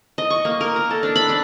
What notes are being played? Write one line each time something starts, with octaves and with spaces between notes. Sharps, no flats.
D#5
C#6
A#3
A#4
A#5
A4
D4
B5
D4